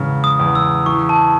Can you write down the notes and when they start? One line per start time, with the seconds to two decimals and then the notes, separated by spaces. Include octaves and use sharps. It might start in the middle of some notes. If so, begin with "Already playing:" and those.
Already playing: E2 C#3 G#3
0.24 D#6
0.40 E2
0.55 E6
0.86 E3 C#6
1.09 A5